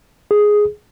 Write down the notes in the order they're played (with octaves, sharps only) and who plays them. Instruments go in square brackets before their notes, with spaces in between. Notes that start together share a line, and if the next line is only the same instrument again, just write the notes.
[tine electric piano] G#4